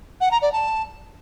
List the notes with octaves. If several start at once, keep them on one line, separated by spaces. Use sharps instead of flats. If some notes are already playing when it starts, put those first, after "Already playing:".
F#5
A#5
D5
A5